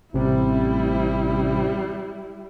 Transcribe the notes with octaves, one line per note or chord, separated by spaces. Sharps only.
A1 C3 G3 E4